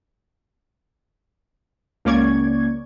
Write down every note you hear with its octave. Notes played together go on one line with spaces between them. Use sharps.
C#2 A#3 C#4 D5 C#6 G#6